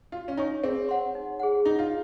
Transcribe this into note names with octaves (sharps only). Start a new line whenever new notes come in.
F4 F#4
C#4
D#4 C#5 G#5 C#6
C4 G#4
C#5 F#5 C6
D#4
G#4 C5 F#5
D#4 F4
F4